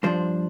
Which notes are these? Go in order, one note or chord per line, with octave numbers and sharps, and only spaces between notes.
G2 F3 D4 C5